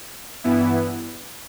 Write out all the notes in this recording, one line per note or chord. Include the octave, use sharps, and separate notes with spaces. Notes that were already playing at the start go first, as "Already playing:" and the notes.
G2 E3 B3 E4